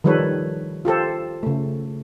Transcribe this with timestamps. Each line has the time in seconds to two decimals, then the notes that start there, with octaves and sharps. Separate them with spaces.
0.04 D#3 F3 G3 A4 B4 C#5
0.85 F4 G4 A4 C5
1.43 C#3 A3